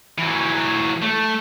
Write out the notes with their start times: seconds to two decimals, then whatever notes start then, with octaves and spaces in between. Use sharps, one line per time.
0.18 E3 F#3
1.02 A3